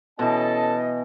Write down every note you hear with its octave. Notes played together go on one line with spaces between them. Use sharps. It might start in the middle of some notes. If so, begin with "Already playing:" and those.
B2 E3 C#4 A4 D#5 A5